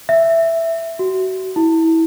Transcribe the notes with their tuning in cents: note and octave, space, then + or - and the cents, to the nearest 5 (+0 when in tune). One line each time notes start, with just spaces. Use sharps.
E5 +5
F#4 +30
E4 -20